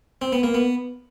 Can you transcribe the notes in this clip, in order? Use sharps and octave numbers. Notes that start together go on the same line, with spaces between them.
C4
B3
A#3
B3